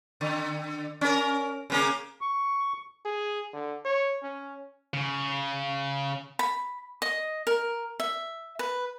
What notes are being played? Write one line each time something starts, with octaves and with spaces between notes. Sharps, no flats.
D3
C#4 A#4
C#3 A#3 C#4
C#6
G#4
D3
C#5
C#4
C#3
B5
D#5
A#4
E5
B4